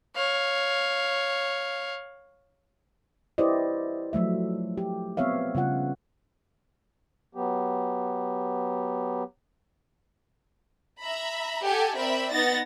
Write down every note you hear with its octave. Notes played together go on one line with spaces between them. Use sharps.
C#5 F5
E4 G4 B4 C5 D5 D#5
F3 F#3 A3 E5
G4
B3 C4 C#5 E5 F5
C#3 G3 F4 F#5
F#3 B3 G4
E5 A#5 B5
G4 A4 F#5 G#5
C4 A#4 D5 E5 B5
B3 D#4 A6 A#6